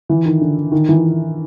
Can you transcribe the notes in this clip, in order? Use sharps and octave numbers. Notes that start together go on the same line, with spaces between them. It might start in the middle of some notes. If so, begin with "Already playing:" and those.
E3
D#3
D3
D#3
E3